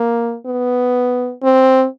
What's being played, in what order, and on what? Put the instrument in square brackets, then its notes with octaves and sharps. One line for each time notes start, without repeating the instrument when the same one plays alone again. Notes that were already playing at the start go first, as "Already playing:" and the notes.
Already playing: [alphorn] A#3
B3
C4